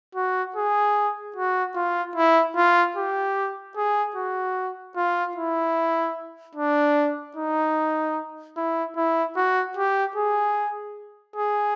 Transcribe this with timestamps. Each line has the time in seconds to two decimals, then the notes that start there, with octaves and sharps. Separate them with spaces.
0.15 F#4
0.56 G#4
1.36 F#4
1.75 F4
2.16 E4
2.56 F4
2.96 G4
3.76 G#4
4.16 F#4
4.97 F4
5.36 E4
6.55 D4
7.36 D#4
8.57 E4
8.96 E4
9.36 F#4
9.77 G4
10.16 G#4
11.36 G#4